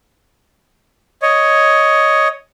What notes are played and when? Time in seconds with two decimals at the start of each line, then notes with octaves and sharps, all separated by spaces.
1.22 C#5 D#5